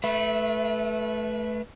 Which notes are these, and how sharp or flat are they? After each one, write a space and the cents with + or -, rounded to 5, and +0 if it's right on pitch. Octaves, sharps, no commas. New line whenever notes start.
A3 -20 B4 -15 E5 +15